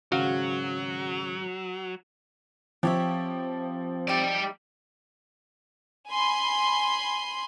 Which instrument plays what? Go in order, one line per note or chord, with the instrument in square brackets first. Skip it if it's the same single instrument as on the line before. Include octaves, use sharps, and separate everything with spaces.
[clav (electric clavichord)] G#1 F#4 F5 [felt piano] C#3 [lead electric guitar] F#3
[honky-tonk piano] F3 [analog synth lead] C4 [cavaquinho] G4 C#5 E5
[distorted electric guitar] G3 D5 [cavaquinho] D#4 G4 E5
[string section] G#5 B5 C6